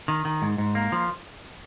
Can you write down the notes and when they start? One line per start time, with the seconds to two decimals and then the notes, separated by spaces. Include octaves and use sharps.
0.08 D#3
0.25 D#3
0.42 G#2
0.58 G#2
0.75 A#3
0.92 F3